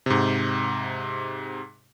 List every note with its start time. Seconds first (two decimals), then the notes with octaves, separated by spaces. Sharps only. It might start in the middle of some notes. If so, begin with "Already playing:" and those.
0.06 G#2 C3